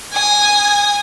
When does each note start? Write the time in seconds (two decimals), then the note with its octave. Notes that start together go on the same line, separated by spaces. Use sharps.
0.13 G#5 D#6